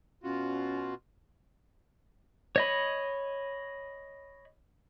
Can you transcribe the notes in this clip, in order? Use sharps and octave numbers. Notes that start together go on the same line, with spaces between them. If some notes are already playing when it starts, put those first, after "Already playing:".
B2 C#4 F4 F#4
C#5 D#5 B5